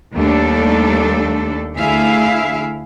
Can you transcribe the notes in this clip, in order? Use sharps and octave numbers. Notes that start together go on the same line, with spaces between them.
D#2 G3 A3 D4 A4
D2 A3 E4 G#4 E5 F5